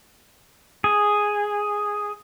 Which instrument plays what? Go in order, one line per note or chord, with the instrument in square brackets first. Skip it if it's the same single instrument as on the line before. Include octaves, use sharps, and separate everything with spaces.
[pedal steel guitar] G#4